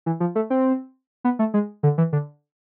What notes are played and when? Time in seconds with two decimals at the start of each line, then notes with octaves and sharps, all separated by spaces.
0.06 E3
0.20 F3
0.35 A3
0.50 C4
1.24 B3
1.39 A3
1.54 G#3
1.83 D3
1.98 E3
2.13 D3